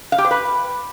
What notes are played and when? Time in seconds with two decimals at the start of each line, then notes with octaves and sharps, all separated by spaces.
0.12 F5
0.18 G4
0.25 C5
0.31 B4